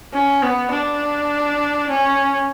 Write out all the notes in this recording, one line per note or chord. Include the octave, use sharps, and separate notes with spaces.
C#4
B3
D4
C#4